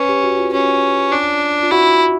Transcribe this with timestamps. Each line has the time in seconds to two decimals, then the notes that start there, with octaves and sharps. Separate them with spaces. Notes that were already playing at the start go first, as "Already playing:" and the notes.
Already playing: C#4 B4
0.09 G4
0.24 F#4
0.38 F4
0.53 C#4
1.12 D4
1.63 F4
1.71 E4 F#4